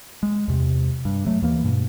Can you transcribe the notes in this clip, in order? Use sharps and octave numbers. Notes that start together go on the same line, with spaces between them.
G#3
E2 C3
G2
F#3 A3
D#2 E3 A#3
G2 B2